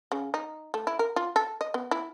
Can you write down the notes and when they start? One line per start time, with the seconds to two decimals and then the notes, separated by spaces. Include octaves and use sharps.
0.12 C#3
0.34 D#4
0.74 A3
0.87 E4
0.99 A#4
1.16 F4
1.36 A4
1.61 D#5
1.74 B3
1.91 E4